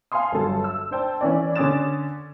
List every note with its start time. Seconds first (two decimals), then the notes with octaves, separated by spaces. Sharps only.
0.12 F5 G#5 A5 C6 D#6
0.32 G1 G2 F#3 A4 A5
0.64 E6
0.91 D4 C5 G5 A5
1.21 E3 C#4 D5
1.56 D3 C#4 D6 D#6 A6 E7